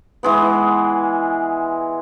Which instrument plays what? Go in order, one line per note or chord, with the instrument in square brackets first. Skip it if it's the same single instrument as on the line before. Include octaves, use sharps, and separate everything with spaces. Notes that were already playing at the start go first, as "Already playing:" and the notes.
[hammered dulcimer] E3 G#3 B3